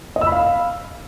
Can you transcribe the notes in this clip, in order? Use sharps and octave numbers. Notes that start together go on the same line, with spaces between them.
D#5
E6
B5
F5